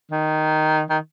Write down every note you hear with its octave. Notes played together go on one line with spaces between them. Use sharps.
D#3
D#3